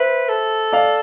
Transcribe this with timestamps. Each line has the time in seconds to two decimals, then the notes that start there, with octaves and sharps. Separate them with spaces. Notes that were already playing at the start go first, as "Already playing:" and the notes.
Already playing: B4 C5 E5
0.29 A4
0.73 D5 F5